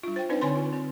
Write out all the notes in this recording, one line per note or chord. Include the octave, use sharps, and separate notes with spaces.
G3 D4 F4
C5 G5
C4 D4 D#4 B4 D5
D3 C4 C#5 G#5 B5 C6
F4
C4